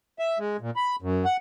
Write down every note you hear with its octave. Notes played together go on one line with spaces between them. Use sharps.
E5
G#3
A#2
B5
F#2
F#5